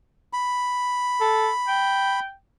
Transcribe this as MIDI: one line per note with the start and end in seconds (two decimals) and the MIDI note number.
0.33 2.20 83
1.21 1.49 69
1.68 2.33 79